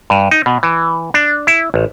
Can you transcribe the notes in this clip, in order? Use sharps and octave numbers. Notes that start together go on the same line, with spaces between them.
G2
D#4
B2
E3
D4
E4
A1